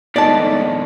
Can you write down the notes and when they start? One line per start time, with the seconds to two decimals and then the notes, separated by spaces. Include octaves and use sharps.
0.16 F2 B2 G#3 A3 D#4 D5 A5